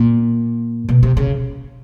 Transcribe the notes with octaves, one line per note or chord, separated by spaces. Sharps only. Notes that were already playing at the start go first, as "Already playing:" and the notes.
Already playing: A#2
B2
C3
C#3